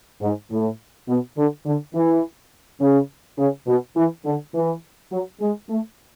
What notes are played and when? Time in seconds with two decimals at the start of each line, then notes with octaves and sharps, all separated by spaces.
0.21 G#2
0.50 A2
1.08 B2
1.37 D3
1.66 D3
1.94 E3
2.81 C#3
3.38 C#3
3.67 B2
3.96 E3
4.25 D3
4.54 E3
5.12 F#3
5.41 G#3
5.70 A3